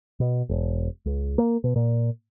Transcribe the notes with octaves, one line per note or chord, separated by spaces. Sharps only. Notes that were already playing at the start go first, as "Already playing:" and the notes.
B2
E1
C#2
A#3
B2
A#2